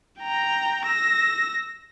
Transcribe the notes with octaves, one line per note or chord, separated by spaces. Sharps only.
G5 A#5
E6 A#6